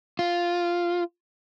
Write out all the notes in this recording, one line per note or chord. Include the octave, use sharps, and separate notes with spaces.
F4